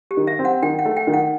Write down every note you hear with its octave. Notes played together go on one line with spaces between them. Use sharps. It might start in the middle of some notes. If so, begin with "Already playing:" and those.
G4
D#3
E5
C4
F#5
D#3 G5
F#5
A3
G5
D#3
F#5